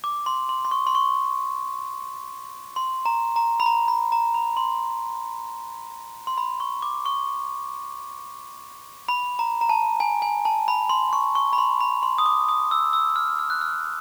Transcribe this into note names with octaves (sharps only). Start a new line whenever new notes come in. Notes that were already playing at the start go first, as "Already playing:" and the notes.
D6
C6
C6
C6
C#6
C6
C#6
C6
A#5
A#5
B5
A#5
B5
A#5
B5
C6
C6
B5
C#6
D6
C#6
B5
A#5
A#5
A5
G#5
G#5
A5
B5
C6
C#6
C#6
B5
C6
B5
C6
D#6
D6
D#6
E6
E6
F6
F6
F#6
F6